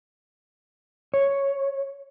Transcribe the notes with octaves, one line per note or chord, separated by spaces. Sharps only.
C#5